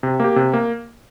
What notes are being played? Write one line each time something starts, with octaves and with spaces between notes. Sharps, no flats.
C3
A#3 G4
C3
A#3